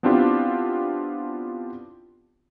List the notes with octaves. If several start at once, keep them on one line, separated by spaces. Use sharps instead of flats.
B3 C4 D4 E4 F4 G4